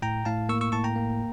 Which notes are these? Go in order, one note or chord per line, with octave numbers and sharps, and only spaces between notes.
A2 G5 A#5
A2 F5 A5
A#3 C#6 E6
C#6 E6
A2 A5 C#6
G5 A#5
A#3